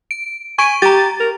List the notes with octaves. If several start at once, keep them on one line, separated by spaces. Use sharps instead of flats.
D7
G#5 C#6 D7 D#7
G4 A#5 A6
A#4